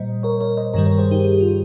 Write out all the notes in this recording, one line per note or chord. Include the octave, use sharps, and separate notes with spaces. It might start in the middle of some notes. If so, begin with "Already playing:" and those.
Already playing: A#2 G3 C5 D#5
A#4 C#5
A#4 C#5
C5 D#5
G2 D#3 G3 A#4 C#5
A#4 C#5
G#4 C5
D#4 G4
D#4
F4